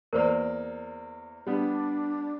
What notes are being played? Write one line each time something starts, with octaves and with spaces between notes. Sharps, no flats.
E2 A#3 A#4 C5 D5
G3 B3 D4